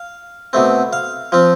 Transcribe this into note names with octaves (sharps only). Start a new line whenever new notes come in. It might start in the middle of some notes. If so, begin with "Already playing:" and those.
Already playing: F5
B2 A3 C4
F5
F3 C4